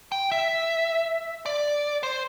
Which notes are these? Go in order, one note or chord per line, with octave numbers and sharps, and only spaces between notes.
G5
E5
D5
C5